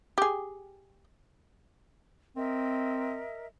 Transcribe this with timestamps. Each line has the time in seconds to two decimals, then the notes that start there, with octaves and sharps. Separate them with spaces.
0.18 G4 G#4
2.36 C4 A#4 D#5 E5